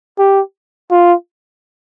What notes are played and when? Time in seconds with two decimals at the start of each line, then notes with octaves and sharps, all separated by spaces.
0.19 G4
0.91 F4